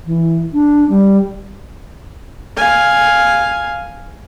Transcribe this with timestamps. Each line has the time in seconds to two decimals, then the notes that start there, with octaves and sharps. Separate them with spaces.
0.06 E3
0.53 D4
0.89 G3
2.57 F5 G#5